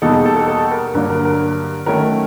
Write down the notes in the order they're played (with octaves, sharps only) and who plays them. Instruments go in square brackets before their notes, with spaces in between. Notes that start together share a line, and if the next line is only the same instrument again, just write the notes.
[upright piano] E2 B2 G3 A#3 D#4 A4
G#4
A4
A4
A4
A#4
G2 D3 F#3 A#3 D4 A#4
A#4
A#4
D#3 F#3 A3 C#4 A#4